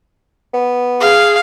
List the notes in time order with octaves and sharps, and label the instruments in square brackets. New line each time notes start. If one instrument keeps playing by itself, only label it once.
[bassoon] B3
[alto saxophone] G#4 [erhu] F5